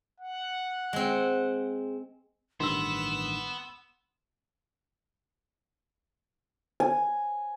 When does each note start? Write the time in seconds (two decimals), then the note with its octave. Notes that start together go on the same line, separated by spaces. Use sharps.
0.20 F#5
0.93 G#3 C4
2.60 A1 G2 D#3 B3 C6 E6 E7
6.80 G#5